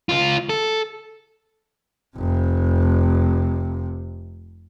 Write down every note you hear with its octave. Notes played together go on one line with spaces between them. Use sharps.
C#2 F4
A4
F1 C3